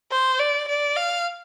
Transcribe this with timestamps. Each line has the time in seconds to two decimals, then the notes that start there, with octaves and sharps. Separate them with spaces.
0.11 C5
0.39 D5
0.68 D5
0.96 F5